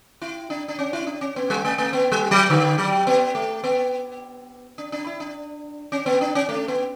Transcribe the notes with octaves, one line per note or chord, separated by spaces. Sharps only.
E4
D4
D4
C#4
E4
D4
C#4
B3
G3
A3
A3
B3
G3
F#3
D3
F#3
B3
A3
B3
D4
D4
E4
D4
C#4
B3
D4
C#4
A3
B3